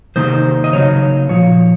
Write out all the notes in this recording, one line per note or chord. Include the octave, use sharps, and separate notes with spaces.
C3 D#3 A#3 D#4 C5
D#5
C#3 F#3 A#3 D#4 C#5
A#2 F3 C#5